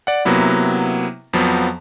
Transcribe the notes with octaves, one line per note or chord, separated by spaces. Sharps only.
D5 F#5
C3 F#3 A#3 B3 E4
F2 F3 F#3 B3